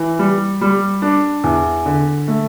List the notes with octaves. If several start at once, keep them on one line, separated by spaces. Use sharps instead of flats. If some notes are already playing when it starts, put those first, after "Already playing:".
Already playing: E3
G3
G3
D4
E2
D3
A3